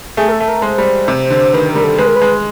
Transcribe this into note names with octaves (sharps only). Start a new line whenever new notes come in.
A3 G#4
A#4
A4
A3
A#4
G#3 C5
G3
C3
D3
D#3 B4
A#4
G3
A4
G#3 B4
A#4
B4
G#3